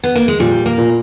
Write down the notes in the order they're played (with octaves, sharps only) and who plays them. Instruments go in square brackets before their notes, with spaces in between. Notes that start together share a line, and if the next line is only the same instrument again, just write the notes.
[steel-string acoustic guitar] B3
A#3
G#3
[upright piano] A#2 [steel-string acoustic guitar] G3
[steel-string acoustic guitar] A#3
[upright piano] A#2